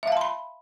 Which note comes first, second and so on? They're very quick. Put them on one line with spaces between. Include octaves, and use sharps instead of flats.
E5 F5 A5 C6 B5